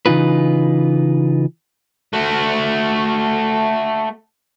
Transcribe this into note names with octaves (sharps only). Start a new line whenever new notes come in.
C#3 E3 D#4 F4 B4
A3 F#4